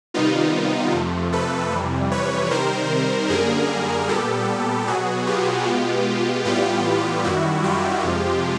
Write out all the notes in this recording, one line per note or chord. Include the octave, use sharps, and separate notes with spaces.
C3 D#3 G3 B3 D#4 F4
F2 C3 F3 A3
A4 B4
F2 C3 E3 G3
B4 C#5
C3 D#3 G3 A#4 C5
F#2 D3 G3 A#3 G#4 A#4
A#2 G3 B3 G4 A4
B2 F#3 B3 F#4 G#4
F4 G4
B2 G#3 B3
A2 E3 G3 B3 F4 G4
F#2 D#3 G3 E4 F#4
F4 G4
F2 C3 F3 G#3